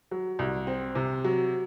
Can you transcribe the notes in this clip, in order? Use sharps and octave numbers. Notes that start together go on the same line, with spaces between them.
F#3
C2
C4
C3
F#3